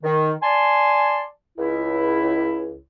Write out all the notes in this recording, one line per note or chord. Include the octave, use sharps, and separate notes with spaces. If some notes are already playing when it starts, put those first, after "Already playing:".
D#3
D5 G#5 A5 C6
C#2 E4